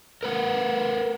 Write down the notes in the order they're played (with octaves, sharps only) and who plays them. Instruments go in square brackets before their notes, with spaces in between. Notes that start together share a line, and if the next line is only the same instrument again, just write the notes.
[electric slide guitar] A#4 B4 F#5